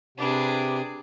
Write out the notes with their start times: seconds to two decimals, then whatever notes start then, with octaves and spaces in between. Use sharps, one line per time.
0.18 C3 D4 G#4 B4 D6